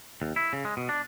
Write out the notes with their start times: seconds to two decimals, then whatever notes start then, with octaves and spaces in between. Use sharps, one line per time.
0.22 D#2
0.36 E4
0.53 C#3
0.65 G#3
0.77 B2
0.89 D4